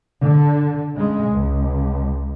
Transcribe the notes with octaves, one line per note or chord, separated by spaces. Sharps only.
D3
C#3 G#3
C#2